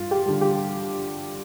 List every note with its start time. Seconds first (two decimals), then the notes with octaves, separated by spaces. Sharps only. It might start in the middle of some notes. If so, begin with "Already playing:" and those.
Already playing: G2 F4
0.11 G4
0.26 D3 G3
0.41 G4